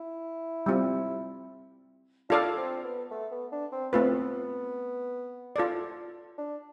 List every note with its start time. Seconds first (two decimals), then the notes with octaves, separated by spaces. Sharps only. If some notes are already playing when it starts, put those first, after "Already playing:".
Already playing: E4
0.66 G3 C4 F4
2.29 D4 F4 A4 D5 F5
2.57 C4
2.84 B3
3.11 A3
3.32 B3
3.52 D4
3.72 C4
3.93 A3 B3 C4 F4 B4
5.56 F4 A4 D5
6.38 D4